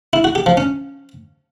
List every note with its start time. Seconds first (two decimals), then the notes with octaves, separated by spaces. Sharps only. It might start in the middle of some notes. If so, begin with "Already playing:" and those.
0.13 E4
0.24 F#4
0.35 G4
0.46 F3
0.57 C#4